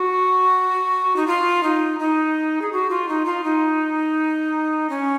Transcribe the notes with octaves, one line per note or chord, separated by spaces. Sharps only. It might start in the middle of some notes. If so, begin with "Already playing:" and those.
Already playing: F#4
D#4
F4
D#4
D#4
G#4
F#4
F4
D#4
F4
D#4
C#4